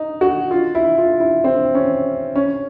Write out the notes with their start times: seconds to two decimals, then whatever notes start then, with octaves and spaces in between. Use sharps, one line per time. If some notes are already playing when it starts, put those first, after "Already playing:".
Already playing: D#4
0.21 F#4
0.51 F4
0.75 E4
0.98 F4
1.20 E4
1.44 C4
1.75 C#4
2.35 C#4